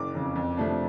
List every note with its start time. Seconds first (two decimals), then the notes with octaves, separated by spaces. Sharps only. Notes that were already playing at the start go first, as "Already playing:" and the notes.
Already playing: F#1 D6
0.15 F2 C#3
0.35 F2
0.57 C3 F3 A3 D4